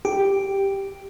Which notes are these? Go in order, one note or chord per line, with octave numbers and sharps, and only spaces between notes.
G4